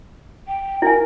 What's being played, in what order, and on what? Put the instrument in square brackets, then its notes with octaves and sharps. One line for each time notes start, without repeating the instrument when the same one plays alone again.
[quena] G5
[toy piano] E4 G#5 [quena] A#4